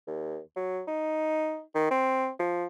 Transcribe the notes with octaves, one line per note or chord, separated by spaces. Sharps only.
D#2
F#3
D#4
D#3
C4
F3